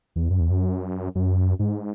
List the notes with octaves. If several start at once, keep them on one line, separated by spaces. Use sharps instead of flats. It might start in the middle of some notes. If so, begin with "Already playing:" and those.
E2
F#2
E2
F#2
F#2
G#2